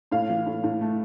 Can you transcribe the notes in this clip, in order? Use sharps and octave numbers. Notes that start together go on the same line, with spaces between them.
A2 F5
E3
A2
A2
A3